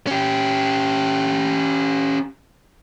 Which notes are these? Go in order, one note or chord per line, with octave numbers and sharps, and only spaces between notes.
C#4 G4